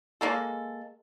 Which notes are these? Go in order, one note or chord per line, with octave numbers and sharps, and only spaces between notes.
G#3 A#3 A4